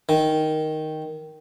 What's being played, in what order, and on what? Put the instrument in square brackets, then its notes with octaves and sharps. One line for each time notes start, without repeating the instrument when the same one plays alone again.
[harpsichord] D#3